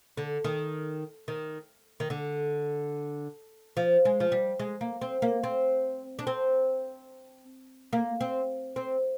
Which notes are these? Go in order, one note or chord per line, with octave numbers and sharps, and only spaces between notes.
D3
D#3
D#3
D#3
D3
F3
G#3
F3
G3
G#3
A#3
C4
A#3
C4
D4
C4
A#3
C4
C4